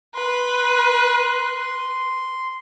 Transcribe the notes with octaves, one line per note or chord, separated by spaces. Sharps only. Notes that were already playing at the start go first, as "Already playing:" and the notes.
B4 C6